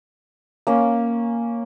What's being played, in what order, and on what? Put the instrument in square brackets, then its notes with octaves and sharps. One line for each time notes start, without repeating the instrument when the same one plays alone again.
[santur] A#3 C#4